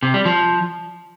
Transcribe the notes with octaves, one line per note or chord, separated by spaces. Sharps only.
C3
G3
F3